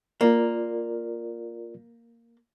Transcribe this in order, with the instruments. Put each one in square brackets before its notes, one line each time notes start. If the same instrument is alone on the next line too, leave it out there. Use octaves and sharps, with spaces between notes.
[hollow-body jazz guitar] A#3 [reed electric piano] F4 A#4 D5